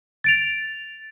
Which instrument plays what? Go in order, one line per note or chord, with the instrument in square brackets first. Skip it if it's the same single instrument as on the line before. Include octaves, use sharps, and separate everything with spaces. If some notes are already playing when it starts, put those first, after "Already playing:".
[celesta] A6 D7 F7